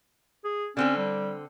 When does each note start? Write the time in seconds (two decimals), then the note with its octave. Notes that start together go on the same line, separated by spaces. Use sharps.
0.44 G#4
0.77 D3 C4 C#4 A4
0.97 G3